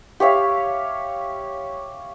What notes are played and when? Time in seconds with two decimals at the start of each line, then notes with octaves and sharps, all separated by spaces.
0.20 G4 C#5 E5 F5